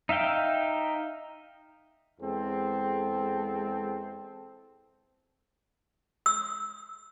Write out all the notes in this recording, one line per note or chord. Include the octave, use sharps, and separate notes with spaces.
D#4 E5 F5 G5
E2 G#3 C4 A4
E6